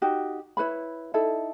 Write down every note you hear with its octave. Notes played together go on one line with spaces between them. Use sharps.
D#4 F#4 G4
E4 B4 C#5 B5
D#4 E4 A4